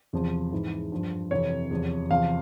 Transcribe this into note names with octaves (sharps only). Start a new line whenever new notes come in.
E2 C3 F3
G#2 E3
G2 F3
F2 C3 E3 C#5
E2 C3 F3
E2 C3 F3 F5